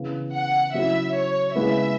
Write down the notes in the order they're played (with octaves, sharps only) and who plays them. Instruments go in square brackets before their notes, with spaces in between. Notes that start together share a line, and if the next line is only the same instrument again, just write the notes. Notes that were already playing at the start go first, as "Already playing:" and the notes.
Already playing: [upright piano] C#3 E3 B3
[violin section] F#5
[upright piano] C#3 F#3 C#4 E4 [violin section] E5
[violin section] C#5
[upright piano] C#3 G#3 B3 E4 [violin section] E5